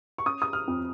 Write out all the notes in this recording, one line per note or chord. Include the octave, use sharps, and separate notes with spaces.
C#6
C#4 D#6
D#6
F6
F2